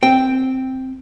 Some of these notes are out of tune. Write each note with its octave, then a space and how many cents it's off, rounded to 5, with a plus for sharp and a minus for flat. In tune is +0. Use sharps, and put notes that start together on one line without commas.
C4 +0 G5 +0